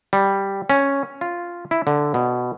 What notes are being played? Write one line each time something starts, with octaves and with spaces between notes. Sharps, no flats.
G3
C#4
F4
E4
D3
B2